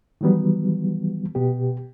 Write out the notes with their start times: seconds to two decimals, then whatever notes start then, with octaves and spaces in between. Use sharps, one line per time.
0.21 D#3 E3 F#3 G3 B3
1.35 B2 B3 G4